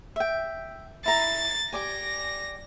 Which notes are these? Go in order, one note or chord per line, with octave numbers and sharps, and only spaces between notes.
E5 G5
E4 A#5 B5 A6
G4 D5 G#5 A#6